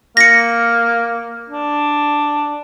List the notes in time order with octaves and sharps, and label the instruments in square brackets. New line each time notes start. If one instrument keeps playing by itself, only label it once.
[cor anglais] A#3 [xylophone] A#6 C#7
[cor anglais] D4